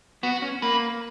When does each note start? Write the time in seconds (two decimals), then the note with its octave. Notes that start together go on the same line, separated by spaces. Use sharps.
0.23 B3 F#4
0.42 C#4
0.62 A#3 B4